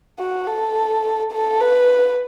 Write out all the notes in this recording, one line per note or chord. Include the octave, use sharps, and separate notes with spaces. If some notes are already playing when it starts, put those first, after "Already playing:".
F#4
A4
A4
B4